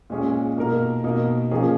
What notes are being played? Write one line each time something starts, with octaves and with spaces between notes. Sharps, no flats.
A#2 G#3 C#4 G#4
B2 A#3 D#4 A#4
B2 A#3 D#4
A#2 F3 A#3 C#4 G#4